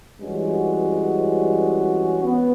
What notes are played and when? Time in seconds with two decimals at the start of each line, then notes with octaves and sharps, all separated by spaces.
0.19 G2 E3 G#3 C#4 F#4
2.23 B3